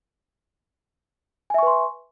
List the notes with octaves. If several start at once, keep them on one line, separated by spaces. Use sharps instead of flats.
B4 E5 G#5 C6 C#6